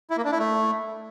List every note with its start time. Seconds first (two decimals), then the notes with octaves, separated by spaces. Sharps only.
0.10 E4
0.17 A#3
0.25 D4
0.32 E4
0.39 A3